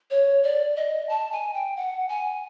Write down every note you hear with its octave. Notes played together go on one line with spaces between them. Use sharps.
C#5
D5
D#5
A5
G#5
G5
F#5
G#5